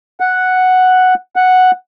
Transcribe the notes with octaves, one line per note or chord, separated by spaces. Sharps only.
F#5
F#5